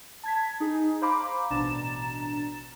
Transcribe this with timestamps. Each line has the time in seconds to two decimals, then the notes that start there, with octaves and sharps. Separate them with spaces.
0.23 A5 G#6 B6
0.60 D#4 G#4
1.02 C5 F5 A#5 B5 D6
1.50 A1 B2 D4 A#5 A6 E7